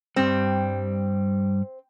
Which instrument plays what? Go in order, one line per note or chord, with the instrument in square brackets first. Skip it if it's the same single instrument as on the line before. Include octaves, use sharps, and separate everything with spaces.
[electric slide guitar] G2 G3 [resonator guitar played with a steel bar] C4